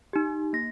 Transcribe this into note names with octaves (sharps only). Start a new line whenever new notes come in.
D#4 G4
A#3 A#6